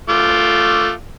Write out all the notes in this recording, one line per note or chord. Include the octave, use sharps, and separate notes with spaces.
A3 F4 D6